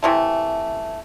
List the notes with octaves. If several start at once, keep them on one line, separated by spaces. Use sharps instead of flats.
C3 E3 A3